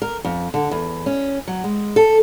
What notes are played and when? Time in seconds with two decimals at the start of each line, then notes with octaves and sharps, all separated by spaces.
0.02 A#4
0.25 F2
0.54 D3
0.71 E2
1.06 C#4
1.48 F#3
1.64 G#3
1.96 A4